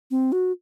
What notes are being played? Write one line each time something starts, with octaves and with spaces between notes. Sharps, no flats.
C4
F#4